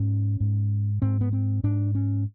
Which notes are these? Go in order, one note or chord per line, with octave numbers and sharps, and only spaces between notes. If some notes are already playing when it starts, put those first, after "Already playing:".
Already playing: G#2 C#4
G#2
G#2 C4
B3
C4
G#2 D4
C#4